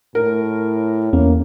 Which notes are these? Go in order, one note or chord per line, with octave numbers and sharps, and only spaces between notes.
A2 A#4
E2 A#3 C#4